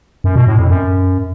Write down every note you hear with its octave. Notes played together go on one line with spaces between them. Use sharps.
F#2
B2
A2
F2
F#2